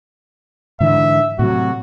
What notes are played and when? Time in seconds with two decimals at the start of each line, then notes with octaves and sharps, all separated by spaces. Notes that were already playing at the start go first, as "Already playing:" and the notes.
0.80 G#2 D3 E3 E5
1.39 A2 C3 F#3 F#4